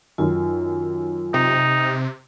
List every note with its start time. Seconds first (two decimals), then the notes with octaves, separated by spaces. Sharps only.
0.18 F#2 D#3 F4
1.34 C3 D#4